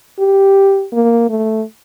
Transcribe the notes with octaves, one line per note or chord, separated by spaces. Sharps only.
G4
A#3
A3